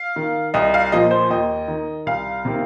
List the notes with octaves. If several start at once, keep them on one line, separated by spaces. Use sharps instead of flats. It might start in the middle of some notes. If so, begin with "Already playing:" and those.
Already playing: F5
D#3
C2 D#5
F5
A#2 F3 D#5
C5
D#2 D#5
D#3
C2 F5
C3 D#3